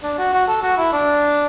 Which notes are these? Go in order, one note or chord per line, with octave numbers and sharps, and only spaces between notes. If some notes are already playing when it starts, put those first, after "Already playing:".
D4
F#4
F#4
A4
F#4
E4
D4